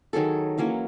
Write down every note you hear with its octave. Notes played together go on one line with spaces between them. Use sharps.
D#3 F#3 G#4 A4
E3 F#3 A#3 C#4